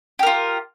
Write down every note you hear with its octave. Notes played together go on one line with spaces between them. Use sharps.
F4 G4 A#4